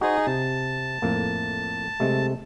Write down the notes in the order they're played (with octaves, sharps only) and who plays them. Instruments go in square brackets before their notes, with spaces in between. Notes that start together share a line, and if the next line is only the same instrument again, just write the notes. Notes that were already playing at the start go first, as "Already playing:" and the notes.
[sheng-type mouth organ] D#4 G#4 [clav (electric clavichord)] F#4 C5
[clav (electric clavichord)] C3 [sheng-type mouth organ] A5
[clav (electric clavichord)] F2 A2 A#3
C3 G#3 A3